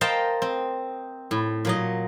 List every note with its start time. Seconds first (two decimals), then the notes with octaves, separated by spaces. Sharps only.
0.01 A#4 C5 D#5 F5 G5 A5
0.42 C4
1.31 A2
1.65 A#2 F#3 D#5